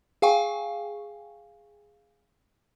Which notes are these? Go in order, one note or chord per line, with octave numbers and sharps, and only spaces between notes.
G#4 F5 G5 G#5 C#6